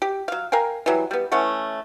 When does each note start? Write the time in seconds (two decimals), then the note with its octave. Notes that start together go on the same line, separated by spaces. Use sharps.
0.02 G4
0.28 F#3 F5
0.52 A#4 F5 G5 G#5
0.86 E3 F#3 G3
1.11 G3 B3
1.32 E3 A3 C#4 F#5